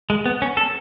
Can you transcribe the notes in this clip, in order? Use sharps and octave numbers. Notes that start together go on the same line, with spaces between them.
G#3
B3
C#4
A4